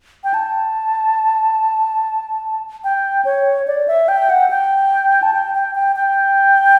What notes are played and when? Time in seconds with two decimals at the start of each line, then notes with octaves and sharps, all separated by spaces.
0.24 G5
0.34 A5
2.84 G5
3.25 C#5
3.67 D5
3.88 E5
4.08 G5
4.30 F#5
4.50 G5
5.22 A5
5.34 G5
5.55 G5
5.75 G5
5.96 G5